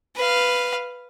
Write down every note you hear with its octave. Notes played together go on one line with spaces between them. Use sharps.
B4 F5